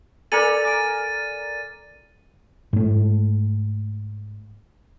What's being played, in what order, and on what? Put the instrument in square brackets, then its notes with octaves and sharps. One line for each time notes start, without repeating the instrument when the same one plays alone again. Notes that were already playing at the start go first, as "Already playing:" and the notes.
[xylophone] A4 A#5 C#7 [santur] A#4 D5 G#5 [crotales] A6 D#7
[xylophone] D6 D7
[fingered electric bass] G#2 A3